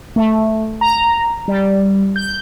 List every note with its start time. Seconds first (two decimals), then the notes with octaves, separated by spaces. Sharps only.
0.16 A3
0.81 A#5
1.48 G3
2.16 G6